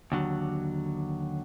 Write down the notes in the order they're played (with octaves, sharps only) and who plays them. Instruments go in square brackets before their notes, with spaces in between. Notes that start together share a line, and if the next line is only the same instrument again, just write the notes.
[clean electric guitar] D#2 D3 F#3